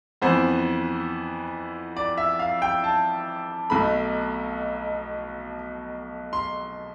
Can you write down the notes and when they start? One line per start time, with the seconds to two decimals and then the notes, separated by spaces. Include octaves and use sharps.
0.22 F2 E3 B3 C5
1.97 D5
2.17 E5
2.39 F5
2.62 G5
2.84 A5
3.70 B1 B2 A3 B5
6.33 C6